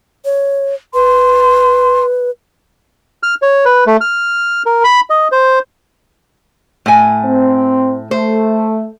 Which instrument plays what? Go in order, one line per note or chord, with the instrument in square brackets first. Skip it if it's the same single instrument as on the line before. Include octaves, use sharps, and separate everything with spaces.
[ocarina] C#5
[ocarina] B4 [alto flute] C6
[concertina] F6
C#5
B4
A3
F6
A#4
B5
D#5
C5
[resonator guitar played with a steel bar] A2 G#5
[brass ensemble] C4
[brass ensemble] A3 [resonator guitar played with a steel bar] C5